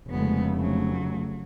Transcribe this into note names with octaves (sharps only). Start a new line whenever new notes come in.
F1 C#3 G#3 A3 B3
F#3